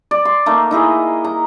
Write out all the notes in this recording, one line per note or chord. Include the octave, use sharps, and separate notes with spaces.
D5
C6
A3 A#3 D#4
D#4 E4 G#4 D#5
A#5